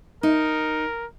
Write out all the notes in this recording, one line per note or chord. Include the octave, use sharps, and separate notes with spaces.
D#4 A#4